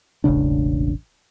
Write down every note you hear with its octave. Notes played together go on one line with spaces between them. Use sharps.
E1 A1 C#3 D4